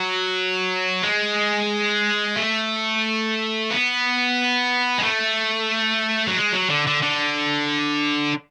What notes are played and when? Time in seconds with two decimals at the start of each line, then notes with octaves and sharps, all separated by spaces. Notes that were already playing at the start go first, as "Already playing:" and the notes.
Already playing: F#3
1.03 G#3
2.36 A3
3.70 B3
4.98 G#3
5.03 A3
6.27 F#3
6.36 G#3
6.53 F#3
6.70 D3
6.87 D3
7.02 D3